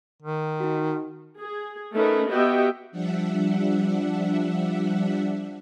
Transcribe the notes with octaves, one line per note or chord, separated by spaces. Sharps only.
D#3
D#4 F#4
G#4
A3 C#4 D#4 A#4 B4
B3 F#4 G4 D#5 E5 G5
F3 G3 D4 E5 F#5